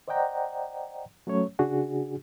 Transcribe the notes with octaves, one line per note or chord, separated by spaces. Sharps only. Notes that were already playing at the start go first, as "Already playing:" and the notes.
C5 D5 D#5 F#5 G5 A#5
F#3 A3 C#4 C#5
C#3 D4 F#4 G#4